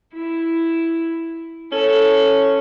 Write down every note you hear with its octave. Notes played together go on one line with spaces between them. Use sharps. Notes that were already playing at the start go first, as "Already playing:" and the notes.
E4
C#4 A4